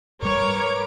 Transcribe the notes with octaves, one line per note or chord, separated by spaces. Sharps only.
G#2 G3 A#4 B4 C#5 D6